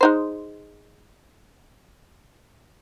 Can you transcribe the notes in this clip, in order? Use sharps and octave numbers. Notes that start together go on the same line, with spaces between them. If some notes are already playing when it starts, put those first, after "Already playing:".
G#3 D#4 C5